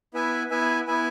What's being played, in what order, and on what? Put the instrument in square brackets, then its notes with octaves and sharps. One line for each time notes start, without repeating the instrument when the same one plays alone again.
[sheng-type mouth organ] B3 E4 B4 E5 G#5
B3 E4 B4 E5 G#5
B3 E4 B4 E5 G#5